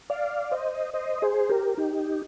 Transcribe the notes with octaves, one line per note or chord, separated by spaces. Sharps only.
D5 F5
C5 D#5
C5 D#5
G#4 C5
G4 A#4
D#4 G4